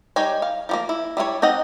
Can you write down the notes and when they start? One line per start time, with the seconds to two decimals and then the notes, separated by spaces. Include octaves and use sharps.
0.16 G3 D#4 C#5 G5 G#5
0.42 F5
0.69 F3 G3 A#3
0.89 E4
1.17 G3 E4 F4 C#5
1.42 C4 D#4 D#5 F#5